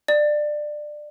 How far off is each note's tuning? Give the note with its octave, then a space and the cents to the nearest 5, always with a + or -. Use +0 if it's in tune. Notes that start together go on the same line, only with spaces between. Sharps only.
D5 +20